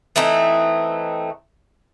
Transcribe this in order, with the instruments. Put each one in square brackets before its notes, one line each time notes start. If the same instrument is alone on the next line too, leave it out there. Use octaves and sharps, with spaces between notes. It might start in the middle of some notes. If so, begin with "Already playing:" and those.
[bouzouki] E3 A3 C4 D#4